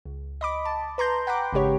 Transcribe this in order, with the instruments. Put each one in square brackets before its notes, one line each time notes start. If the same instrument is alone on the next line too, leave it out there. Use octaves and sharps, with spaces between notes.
[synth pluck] C#2
D#5 B5 D6
A5
B4 A#5 C6 G6
F#5 G5 A#5 B5 D6
G#1 C#3 G#3 G4 C#5